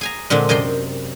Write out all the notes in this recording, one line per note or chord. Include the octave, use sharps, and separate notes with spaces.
G#4 G#5 A#5
A#2 D3 G#3 C4 D4
F#2 C3 D#5 G5 C6